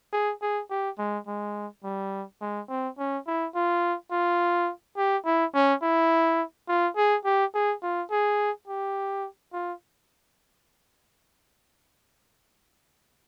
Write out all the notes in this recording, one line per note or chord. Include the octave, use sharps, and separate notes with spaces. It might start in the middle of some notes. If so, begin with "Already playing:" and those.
G#4
G#4
G4
G#3
G#3
G3
G#3
C4
C#4
E4
F4
F4
G4
E4
C#4
E4
F4
G#4
G4
G#4
F4
G#4
G4
F4